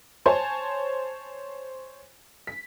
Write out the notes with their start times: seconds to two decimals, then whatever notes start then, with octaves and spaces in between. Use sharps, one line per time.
0.26 C5 C#5 G#5 A5 C6
2.47 B6